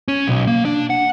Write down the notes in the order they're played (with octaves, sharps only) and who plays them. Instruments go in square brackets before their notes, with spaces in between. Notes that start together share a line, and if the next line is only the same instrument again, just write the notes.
[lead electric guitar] C#4
B1
A#3
D4
F#5